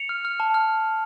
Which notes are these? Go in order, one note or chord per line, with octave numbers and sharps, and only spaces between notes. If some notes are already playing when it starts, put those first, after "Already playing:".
Already playing: C#7 F7
F6
F6
A5
F6